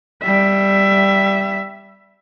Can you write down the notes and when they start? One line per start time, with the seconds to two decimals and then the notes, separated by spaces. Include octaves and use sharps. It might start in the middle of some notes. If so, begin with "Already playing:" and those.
0.23 G3 E5